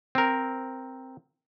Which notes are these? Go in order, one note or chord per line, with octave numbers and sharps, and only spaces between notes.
C4 A#4